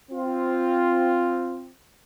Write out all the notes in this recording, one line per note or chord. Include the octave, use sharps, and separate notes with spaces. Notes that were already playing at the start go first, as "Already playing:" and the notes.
C4 F4